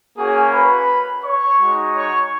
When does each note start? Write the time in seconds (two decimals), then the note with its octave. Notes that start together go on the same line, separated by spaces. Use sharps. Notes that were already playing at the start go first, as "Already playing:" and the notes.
0.16 A#3 C#4 F#4 G#4 G#5
0.52 B4 B5
1.24 C#5 C#6
1.59 G#3 D#4 F#4
1.95 C#5 C#6